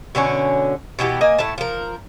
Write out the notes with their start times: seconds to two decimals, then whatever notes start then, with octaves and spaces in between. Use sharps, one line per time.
0.15 B2 D3 C#4 C#5
0.99 B2 E3 B3 G4
1.21 A#3 D#5 G#5
1.39 A2 A3 A5
1.58 F3 A#4